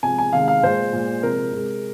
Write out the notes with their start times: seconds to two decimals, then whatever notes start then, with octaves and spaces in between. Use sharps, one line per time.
0.03 C3 F3 G#3 G#5
0.19 G#5
0.33 C3 D#3 G#3 F5
0.48 F5
0.63 A#2 G#3 C5
0.93 A#2 G#3
1.22 C3 F3 G#3 A#4
1.53 C3 G#3